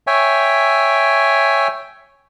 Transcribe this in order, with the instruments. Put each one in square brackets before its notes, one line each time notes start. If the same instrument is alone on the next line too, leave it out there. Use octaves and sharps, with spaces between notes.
[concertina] C#5 E5 G5 G#5